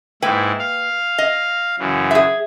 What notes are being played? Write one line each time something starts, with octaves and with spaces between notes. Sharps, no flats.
G#2 A#3 E4 B4 G5
F5
D#5
F#2 C#3 E3
G#4 E5